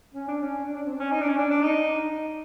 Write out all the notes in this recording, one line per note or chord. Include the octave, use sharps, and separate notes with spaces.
C#4
D4
C#4
D4
D4
C4
D4
C#4
D#4
D4
C#4
D4
D4
D#4